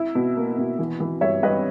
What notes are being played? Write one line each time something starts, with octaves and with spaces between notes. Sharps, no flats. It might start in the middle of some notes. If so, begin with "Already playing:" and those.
Already playing: E4
B2
A#3
B2
E3
E3
G2 C#5 E5
G2 B4 D#5